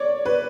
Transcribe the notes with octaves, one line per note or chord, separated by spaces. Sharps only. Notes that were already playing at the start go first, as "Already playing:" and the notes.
Already playing: C#5 D5
B4